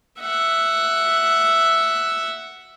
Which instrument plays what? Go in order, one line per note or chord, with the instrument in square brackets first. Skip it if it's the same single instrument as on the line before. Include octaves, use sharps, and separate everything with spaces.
[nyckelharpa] E5 F#5